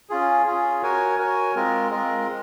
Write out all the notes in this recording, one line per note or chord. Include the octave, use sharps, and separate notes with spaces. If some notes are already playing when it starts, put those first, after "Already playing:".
C#4 F4 G#4
C#4 F4 G#4
F#4 A#4 C#5 G#5
F#4 A#4 C#5 G#5
G#3 C4 F4 A#4 D#5
G#3 C4 F4 A#4 D#5
G#3